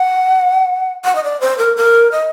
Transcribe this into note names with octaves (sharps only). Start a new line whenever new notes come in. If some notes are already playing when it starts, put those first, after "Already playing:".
Already playing: F#5
F#5
D#5
D5
C5
A#4
A#4
D#5